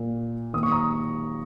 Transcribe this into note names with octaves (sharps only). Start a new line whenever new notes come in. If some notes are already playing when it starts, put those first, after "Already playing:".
Already playing: A#2 A#3
D#3 A#3 D#6
C#6
A#5 D#6